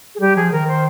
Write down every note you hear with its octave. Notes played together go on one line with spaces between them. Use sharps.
G#4
G3 G4
F3 G#4
D#3 A#4
C5